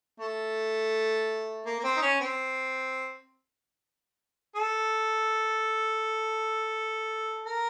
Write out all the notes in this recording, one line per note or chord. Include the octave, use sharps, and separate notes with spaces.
A3
A#3
A#3
C4
D#4
C#4
C4
A4
A#4